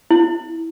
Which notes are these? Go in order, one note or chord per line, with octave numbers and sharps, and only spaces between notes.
E4